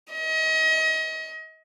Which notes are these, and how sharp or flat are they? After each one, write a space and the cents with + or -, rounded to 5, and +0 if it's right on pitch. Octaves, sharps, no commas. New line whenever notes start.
D#5 +35